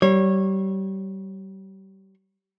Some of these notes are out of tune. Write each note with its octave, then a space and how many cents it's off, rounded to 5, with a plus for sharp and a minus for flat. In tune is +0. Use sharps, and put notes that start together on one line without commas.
G3 -30 C#5 -20